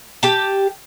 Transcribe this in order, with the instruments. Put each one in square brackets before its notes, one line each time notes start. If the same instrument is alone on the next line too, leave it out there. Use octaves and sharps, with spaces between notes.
[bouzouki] G4 A5